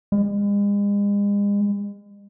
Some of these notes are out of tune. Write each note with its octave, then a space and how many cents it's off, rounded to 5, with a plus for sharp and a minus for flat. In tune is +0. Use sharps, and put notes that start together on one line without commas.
G#3 -40